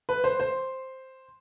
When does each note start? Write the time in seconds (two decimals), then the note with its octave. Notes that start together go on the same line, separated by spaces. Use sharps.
0.09 B4
0.24 C5
0.40 C5